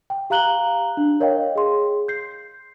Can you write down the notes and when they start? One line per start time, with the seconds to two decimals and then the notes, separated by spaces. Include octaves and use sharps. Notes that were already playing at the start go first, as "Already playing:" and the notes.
0.10 G5
0.30 G4 F5 A#5 F#6 F#7 G7
0.97 D4
1.20 A#4 C#5 D#5 F5 G5
1.56 G#4 C6
2.08 G6 C7